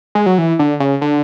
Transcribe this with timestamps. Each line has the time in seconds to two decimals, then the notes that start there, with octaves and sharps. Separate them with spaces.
0.15 G#3
0.26 F#3
0.38 E3
0.59 D3
0.80 C#3
1.01 D3